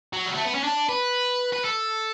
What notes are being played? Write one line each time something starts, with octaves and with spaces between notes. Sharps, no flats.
F#3
G3
A3
B3
C#4
D4
B4
B4
A4